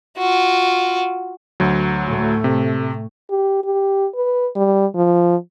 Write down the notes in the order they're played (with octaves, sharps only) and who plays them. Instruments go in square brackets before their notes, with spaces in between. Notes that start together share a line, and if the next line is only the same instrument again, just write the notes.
[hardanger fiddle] F4 F#4
[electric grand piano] D2 F#3
[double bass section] A2 A3
[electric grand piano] C3
[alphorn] G4
G4
B4
G3
F3